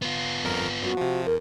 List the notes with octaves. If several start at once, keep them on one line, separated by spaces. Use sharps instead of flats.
B3 F4
G1 F2 A#4
F#2 F#4
C3 F3
E2 A#4